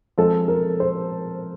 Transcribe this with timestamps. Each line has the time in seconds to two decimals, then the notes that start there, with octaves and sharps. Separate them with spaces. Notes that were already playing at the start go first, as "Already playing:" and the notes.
0.18 F3 G#3 C4 A4
0.48 A#4
0.80 C5